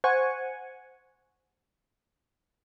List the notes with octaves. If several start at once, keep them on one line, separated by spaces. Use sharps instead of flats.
C5 F#5 G#5 C#6